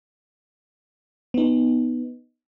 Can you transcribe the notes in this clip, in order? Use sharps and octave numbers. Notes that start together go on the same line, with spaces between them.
B3 D#4